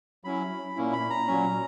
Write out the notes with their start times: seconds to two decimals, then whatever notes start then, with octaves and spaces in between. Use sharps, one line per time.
0.24 F#3 C#4 E4 B5
0.76 A#2 A#3 C#4 E4
0.93 B5
1.10 A#5
1.27 A#2 F#3 C#4